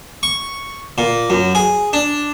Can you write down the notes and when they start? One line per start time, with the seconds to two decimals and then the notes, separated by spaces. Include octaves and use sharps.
0.23 C#6
0.98 A#2
1.30 F#2
1.55 G#4
1.93 D4